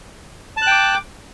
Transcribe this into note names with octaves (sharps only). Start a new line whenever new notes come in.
G5 A5 D6 F#6